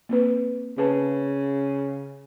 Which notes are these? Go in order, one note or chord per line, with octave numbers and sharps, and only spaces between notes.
A#3 C4 B4
C#3 G#4 B4 A5